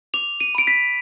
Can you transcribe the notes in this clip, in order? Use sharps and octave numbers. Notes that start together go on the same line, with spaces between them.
D6 F7
D#7
B5 D7
B6